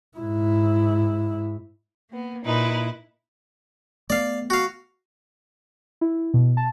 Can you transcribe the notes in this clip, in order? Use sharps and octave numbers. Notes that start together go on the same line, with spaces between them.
G#2 E4
A#3 B3
A#2 D#4 E4 B4
A3 B3 D5 F5
F#4 F5
E4
B2
A5